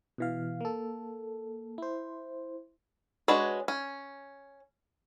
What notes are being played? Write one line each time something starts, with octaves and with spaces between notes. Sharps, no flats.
B2 E3 F5
A#3 A4
E4 C5
G#3 D4 F#4 B4 C#5
C#4